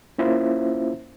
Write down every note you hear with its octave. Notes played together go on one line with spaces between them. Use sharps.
A#3 C#4 E4 F4 C5 E5